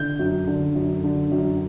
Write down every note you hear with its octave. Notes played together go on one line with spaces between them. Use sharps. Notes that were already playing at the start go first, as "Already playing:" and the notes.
Already playing: D3 G6
F#2
D3
F#2
D3
F#2